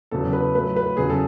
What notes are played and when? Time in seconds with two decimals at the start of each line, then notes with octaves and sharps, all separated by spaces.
0.11 E2 C#3 F#3 A4
0.33 B4
0.55 A2 F#3 B4
0.76 B4
0.97 E2 C#3 F#3 G#4
1.10 A4